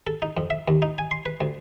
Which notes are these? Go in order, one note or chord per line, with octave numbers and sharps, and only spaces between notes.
A4
D#4
F2
E5
D#2
D#4
G#5
C6
B4
D2